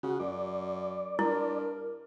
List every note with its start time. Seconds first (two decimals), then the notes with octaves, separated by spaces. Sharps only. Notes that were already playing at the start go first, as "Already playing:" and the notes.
0.03 C#3 F#4
0.20 F#2 D5
1.19 G2 E4 A#4